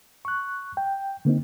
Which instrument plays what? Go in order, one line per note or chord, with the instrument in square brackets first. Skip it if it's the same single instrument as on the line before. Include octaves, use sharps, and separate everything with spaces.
[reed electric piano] C#6 F#6
G5
D3 A#3 C4 D#4